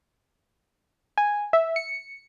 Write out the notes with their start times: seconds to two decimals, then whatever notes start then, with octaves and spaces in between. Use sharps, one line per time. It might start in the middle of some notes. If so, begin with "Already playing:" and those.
1.18 G#5
1.53 E5
1.76 C#7